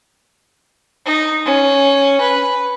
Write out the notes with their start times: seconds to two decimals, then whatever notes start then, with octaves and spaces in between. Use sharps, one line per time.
1.05 D#4
1.45 C#4
2.21 B4